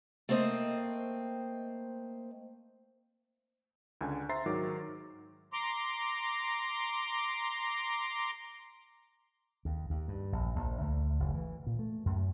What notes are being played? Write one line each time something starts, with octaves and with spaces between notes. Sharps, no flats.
A3 A#3 C4 C5 D#5
C#2 D3 G#5
C5 E5 A#5 C6 A6 C7
G#2 D#3 F#3 A#4 C#5 D6
A#5 C6 D6
D#2
D#2
G2
A#1
A#1
D2
F#1
E3
A#2
A3
F#2